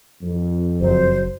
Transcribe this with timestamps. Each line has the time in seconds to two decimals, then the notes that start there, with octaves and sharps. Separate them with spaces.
0.22 F2
0.81 F#1 F#3 C5